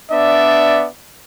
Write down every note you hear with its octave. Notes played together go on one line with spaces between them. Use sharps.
B3 D4 D5 E5